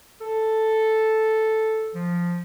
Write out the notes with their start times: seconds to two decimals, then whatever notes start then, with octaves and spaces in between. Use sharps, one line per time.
0.21 A4
1.94 F3